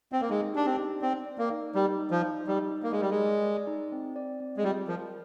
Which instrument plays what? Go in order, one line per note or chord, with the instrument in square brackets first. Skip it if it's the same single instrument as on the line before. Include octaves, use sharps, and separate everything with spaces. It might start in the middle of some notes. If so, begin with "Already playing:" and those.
[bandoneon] C4
A#3
[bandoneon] G#3 [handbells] D#4
[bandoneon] D4 [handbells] G4
[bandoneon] C4
[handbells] D#4
[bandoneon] C4 [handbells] D5
[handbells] D5
[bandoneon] A#3
[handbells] D#4
[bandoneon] G3 [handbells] D#4
[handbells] D#4
[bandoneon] F3
[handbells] D#4
[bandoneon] G3 [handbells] D#4
[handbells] D#4
[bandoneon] A#3
[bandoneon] G#3 [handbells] A#4
[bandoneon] G3
G#3
[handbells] D5
D5
D#4
C4
D5
C4
[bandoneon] G#3
[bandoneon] G3 [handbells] F4
[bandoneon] F3 [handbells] A#4